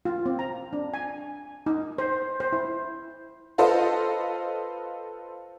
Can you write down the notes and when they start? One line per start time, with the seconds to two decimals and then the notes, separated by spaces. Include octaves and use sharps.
0.05 F4
0.26 C4
0.39 A#5
0.73 D4
0.94 G#5
1.66 D#4
1.98 C5
2.40 C5
2.52 E4
3.58 F4 A4 B4 C5 D#5 F5